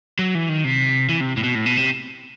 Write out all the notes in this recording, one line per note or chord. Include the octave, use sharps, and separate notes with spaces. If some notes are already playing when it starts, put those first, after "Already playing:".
F#3
E3
D#3
C3
E3
C3
A2
B2
A2
B2
C3